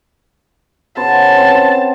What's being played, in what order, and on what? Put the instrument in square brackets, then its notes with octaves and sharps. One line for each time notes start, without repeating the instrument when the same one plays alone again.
[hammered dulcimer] C#3 B3 C5 [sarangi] A5
[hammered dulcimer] C4 C5